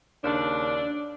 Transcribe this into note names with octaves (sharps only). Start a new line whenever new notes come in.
D#2 C#3 D4